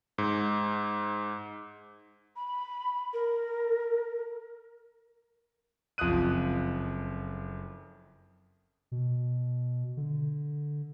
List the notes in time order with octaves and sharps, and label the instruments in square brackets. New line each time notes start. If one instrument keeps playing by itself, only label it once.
[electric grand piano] G#2
[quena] B5
A#4
[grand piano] F#1 F2 F4 D#6 F#6 D#7
[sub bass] B2
D3